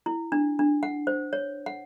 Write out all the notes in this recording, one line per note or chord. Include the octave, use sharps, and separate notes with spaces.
E4
D4
D4
F#5
C5
C#5
F#5